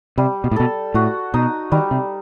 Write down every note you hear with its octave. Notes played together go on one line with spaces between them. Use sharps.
C3 G3
B2
A2
B2 A4
A2 F#4
B2 D#4
D#3 G3
C3